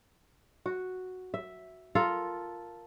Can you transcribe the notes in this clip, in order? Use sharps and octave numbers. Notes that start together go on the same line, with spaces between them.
F#4
E5
F4 A4 A#4 F5